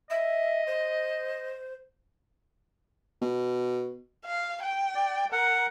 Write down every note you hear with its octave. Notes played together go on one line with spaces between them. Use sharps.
D#5 E5
C5
B2
F5
G5
D5
A#4 F#5